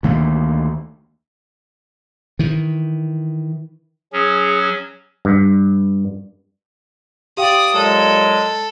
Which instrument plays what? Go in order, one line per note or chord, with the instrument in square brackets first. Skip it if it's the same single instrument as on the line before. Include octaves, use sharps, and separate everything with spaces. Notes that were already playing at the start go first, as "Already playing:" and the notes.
[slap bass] D2 D#3 A3 A#3
D#3 E3
[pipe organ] F#3 C#4 [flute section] G#4 D#6
[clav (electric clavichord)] G2
[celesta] G4 F5 G5 [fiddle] D5 D#6
[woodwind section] A#2 F#3 G#3 [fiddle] A4